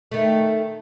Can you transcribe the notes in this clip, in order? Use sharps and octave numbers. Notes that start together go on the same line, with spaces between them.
D#3 A3